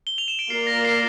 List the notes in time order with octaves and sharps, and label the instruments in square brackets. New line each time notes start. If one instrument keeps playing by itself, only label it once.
[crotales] G7
F7
E7
D7
[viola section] A#3 F4 A#4 D5 [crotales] C7
[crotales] A#6
C7